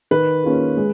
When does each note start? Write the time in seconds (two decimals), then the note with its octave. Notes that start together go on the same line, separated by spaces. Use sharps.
0.11 D#3 B4
0.44 A#3 C#4 F4 G#4
0.77 G#3